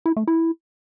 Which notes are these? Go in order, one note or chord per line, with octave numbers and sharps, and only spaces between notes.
E4
A3
E4